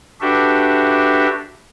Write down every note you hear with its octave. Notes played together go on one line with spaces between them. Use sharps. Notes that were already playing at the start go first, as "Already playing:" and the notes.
D4 F#4 G4 A4 B4 E5